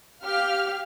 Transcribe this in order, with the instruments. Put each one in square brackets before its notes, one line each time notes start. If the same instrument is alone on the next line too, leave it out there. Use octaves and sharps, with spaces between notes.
[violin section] G4 F5 F6